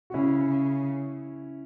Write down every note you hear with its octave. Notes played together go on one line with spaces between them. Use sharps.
F#4
C#3 C#4 E4
C#3